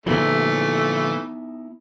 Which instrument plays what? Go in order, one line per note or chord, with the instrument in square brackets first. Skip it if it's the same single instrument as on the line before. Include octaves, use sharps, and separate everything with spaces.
[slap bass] A#2 D3 F3 [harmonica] E3 A3 [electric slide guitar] B3 D#4 E4